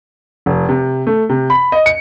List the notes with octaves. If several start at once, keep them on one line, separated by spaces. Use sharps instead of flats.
F1
C3
A3
C3
B5
D#5
C#7